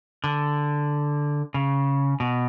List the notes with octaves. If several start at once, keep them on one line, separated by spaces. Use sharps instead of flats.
D3
C#3
B2